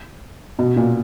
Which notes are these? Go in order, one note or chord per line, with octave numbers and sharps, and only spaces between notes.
B2
A#2